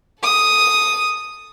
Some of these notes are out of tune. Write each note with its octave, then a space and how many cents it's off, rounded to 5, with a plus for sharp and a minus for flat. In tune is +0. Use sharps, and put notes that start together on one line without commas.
A4 -5 D#6 +0